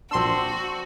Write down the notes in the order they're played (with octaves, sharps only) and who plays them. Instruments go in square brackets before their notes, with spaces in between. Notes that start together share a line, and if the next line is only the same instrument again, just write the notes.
[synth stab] A#1 C6 E6 [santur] C4 D4 [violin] F#4